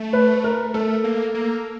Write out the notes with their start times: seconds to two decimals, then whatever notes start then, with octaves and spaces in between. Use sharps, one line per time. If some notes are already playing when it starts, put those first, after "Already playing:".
Already playing: A3
0.13 B4
0.44 A#4
0.74 A3 A4
1.04 A#3
1.34 A#3